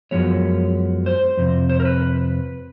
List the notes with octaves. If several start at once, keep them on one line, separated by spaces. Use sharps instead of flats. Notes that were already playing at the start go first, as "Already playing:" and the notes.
F#2 C#3 F3 G#3 B3 C#5
C5
F2 C3
C5
A#4
B4